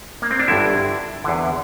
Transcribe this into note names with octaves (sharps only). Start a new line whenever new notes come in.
A#3
C4
D4
G1 G2 D3 E4
E2 D3